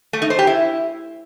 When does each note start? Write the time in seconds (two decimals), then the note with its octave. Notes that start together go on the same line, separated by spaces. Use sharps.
0.13 A3
0.22 D#4
0.30 C5
0.39 G4
0.47 E4